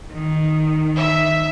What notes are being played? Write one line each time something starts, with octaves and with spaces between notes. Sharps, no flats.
D#3
E5